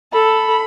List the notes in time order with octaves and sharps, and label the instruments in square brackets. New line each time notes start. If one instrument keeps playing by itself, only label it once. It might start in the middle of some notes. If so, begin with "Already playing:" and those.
[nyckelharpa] A4 [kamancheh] B5